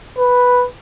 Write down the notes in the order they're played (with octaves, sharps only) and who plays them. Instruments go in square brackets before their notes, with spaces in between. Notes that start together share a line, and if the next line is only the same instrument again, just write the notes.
[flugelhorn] B4